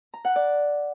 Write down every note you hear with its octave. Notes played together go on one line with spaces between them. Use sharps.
A#5
F#5
D5